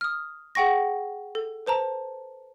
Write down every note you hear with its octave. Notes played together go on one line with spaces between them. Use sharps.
D#6 F6
G#4 F#5 G5 C#6 A#6
A4
B4 C5 A5 A#5